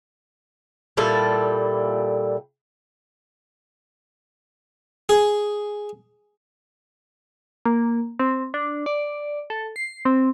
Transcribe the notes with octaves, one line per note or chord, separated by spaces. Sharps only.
A#2 G3 E4 A4
G#4
A#3
C4
D4
D5
A4
C7
C4